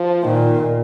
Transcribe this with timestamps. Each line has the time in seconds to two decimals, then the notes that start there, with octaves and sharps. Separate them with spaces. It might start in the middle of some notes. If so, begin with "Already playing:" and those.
Already playing: F3
0.24 A#2 D#3